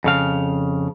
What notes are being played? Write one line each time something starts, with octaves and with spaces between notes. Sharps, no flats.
F2 C#3 F5